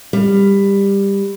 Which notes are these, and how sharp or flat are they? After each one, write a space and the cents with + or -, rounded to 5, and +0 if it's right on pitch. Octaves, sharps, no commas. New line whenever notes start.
G3 +15